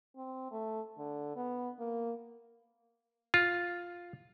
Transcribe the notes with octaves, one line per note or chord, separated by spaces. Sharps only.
C4
A3
D3
B3
A#3
F4